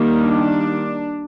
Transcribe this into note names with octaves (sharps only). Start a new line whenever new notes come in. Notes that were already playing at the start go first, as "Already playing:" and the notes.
Already playing: D#3 G3 A#3
D4